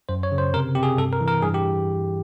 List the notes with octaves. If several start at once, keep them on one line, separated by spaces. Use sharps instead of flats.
F#2 C5
C#5
C#3
C5
C3 A#4
C3 G4
G#4
G2 A4
A#4
E3
A#4
G2 G#4
G4